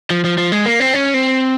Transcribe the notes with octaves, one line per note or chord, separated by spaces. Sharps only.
F3
F3
F3
G#3
A#3
C4
C#4
C4